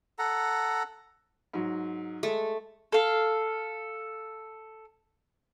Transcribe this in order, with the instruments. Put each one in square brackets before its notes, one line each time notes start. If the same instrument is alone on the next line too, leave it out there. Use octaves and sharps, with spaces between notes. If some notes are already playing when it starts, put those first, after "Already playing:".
[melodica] A4 F#5 A#5
[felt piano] G#2 F#3
[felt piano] G#3 [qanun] A3
[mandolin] A4 F5